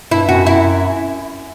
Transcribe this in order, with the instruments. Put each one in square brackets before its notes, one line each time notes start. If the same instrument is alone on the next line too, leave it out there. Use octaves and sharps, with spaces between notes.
[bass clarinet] G2 [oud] E4
[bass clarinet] F#2 [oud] F#4
[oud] E4